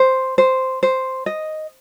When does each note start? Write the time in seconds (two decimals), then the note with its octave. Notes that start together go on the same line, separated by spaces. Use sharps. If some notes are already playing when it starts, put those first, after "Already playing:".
Already playing: C5
0.38 C5
0.83 C5
1.26 D#5